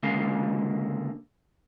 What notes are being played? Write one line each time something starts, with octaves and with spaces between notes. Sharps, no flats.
C#2 D3 G#3 A#3 C#4 F5